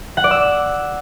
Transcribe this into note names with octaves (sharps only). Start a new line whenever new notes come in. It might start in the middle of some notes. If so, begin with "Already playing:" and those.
F#5
D5
E6